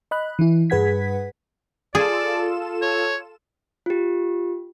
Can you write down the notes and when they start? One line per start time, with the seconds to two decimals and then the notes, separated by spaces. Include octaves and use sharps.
0.11 D#5 B5 F#6
0.39 E3 E4
0.70 G2 G#4 B4 F#5 G#6 B6
1.95 F4 G#4 A4 D5 E7
2.82 C#5
3.86 F4 G4